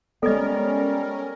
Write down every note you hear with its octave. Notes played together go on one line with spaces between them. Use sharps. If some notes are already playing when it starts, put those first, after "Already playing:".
G3 G#3 B3 C#4 A4 A#4 D#5